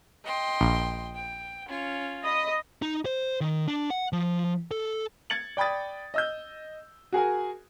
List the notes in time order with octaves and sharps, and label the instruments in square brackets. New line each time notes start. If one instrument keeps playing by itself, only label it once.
[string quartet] D#5 G5 C6
[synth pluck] A#1
[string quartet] G5
C#4 F4
[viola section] D#5 [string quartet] B5
[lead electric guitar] D#4
C5
D#3
D4
F#5
F3
A4
[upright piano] G#6 A6 C#7 F#7
D5 G5 B5 D#6 A6
D#5 E6 G6
F#4 G#4 A#4 G#5